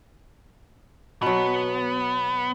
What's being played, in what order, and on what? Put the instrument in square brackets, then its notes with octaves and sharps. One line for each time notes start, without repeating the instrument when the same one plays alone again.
[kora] B2 F#3 [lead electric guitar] B3